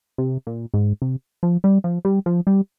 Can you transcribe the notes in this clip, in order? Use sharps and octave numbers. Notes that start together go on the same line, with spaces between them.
C3
A#2
G#2
C3
F3
G3
F3
G3
F3
G3